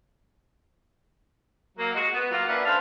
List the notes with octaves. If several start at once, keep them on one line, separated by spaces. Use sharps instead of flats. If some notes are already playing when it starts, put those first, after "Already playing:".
F#3 A#3
G#3 F#4
B3
F#3 A#3 F4
A#3 C#4 D4 B4 E5 F#5
D2 D4 B4 C5 F5